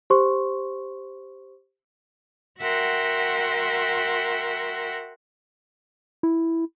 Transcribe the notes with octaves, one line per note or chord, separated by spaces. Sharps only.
G4 C5 C6 C#6
F#4 A#4 E5 F#5 G5 C6
E4